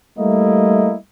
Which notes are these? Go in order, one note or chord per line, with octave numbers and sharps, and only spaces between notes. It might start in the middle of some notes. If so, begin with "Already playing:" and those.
G3 A3 A#3 E4 D#5